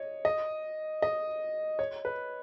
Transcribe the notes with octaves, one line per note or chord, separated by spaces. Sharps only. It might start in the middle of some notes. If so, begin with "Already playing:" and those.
Already playing: C#5 D#5
D#5
D#5
C#5
B4